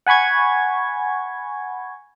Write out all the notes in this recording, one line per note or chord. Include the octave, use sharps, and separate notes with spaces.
F#5 G#5 B5 C#6 G#6